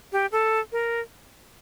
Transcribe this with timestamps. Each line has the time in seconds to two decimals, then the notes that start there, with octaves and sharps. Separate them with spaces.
0.12 G4
0.32 A4
0.72 A#4